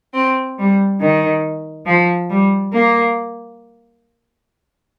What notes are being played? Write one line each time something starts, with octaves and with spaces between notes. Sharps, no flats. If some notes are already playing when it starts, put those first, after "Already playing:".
C4
G3
D#3
F3
G3
A#3